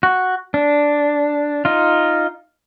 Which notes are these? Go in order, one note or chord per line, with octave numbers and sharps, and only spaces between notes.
F#4
D4
D#4 F4